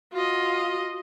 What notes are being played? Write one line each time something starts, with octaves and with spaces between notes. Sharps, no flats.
F4 F#4 D#5